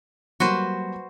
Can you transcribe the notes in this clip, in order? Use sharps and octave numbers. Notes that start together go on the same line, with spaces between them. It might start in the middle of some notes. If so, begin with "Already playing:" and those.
F#3 G3 A#3 F#4 B4 C5